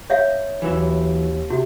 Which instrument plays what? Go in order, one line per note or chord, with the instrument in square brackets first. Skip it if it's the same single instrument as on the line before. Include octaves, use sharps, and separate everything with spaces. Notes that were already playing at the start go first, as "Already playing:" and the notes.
[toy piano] C#5 E5 F5
[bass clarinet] D#2 [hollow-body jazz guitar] E3 F#3 E4
[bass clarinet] C3 [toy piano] F#4